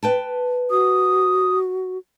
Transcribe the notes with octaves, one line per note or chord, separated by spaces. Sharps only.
B4 G5 A5
F#4 D#6